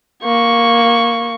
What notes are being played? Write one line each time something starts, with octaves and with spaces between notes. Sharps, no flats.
A#3 C#6